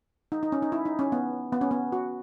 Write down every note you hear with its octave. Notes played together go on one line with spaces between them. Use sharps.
D#4
D#4
C#4
D#4
E4
D#4
C#4
B3
B3
C#4
B3
F#4